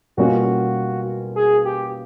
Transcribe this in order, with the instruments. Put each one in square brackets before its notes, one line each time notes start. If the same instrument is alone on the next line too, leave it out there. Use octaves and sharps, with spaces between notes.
[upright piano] B2 G3 A#3 C#4 F4 [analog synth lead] F#4
[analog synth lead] G#4
G4